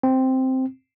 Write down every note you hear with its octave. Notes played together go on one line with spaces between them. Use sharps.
C4